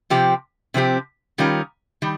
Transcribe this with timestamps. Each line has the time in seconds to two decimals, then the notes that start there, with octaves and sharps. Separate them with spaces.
0.10 C3 F3 C4 G4
0.74 C3 F3 C4 G4
1.38 D#3 G3 C#4 F4 A#4
2.02 D#3 G3